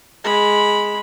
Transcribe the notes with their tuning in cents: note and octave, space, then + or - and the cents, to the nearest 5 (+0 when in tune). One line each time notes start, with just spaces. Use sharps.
G#3 +0 B5 -10